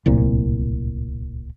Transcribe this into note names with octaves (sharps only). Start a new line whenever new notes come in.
D1 C2 A#2